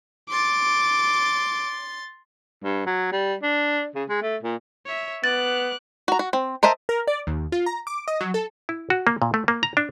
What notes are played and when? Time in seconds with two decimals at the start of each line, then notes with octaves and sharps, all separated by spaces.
0.31 C6 D6 A6
2.63 G2
2.86 F#3
3.12 G3
3.42 D4
3.95 C#3
4.09 G#3
4.22 A3
4.43 A#2
4.86 C#5 E5
5.24 B3 D6 F#6 A6
6.08 F#4 A#5
6.19 F#4
6.33 C4
6.63 A#4 C5 D#5 E5 A5
6.89 A#4
7.07 D5
7.27 D#2
7.52 F4
7.66 A#5
7.87 D6
8.08 D#5
8.21 F#3
8.34 A4
8.69 E4
8.90 F#4
9.07 A#3
9.22 A#2
9.34 A3
9.48 A#3
9.63 A#5
9.77 D4